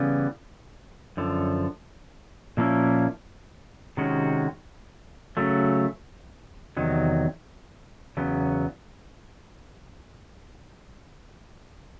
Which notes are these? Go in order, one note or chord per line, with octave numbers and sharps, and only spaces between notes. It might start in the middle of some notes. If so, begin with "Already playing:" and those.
Already playing: C#3 E3 G3 B3
F#2 D3 F3
A#2 F3 A#3 C#4 E4
C3 D#3 G#3 C#4 F#4
C#3 F#3 A3
E2 C3 D#3 F#3
E2 C#3 F#3 B3